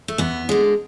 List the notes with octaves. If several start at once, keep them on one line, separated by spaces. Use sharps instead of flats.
A3
E2 B3
D3 G#3